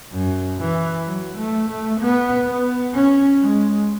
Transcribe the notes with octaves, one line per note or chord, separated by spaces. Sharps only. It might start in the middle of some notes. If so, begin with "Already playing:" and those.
F#2
E3
F#3
A3
A3
B3
B3
C#4
G#3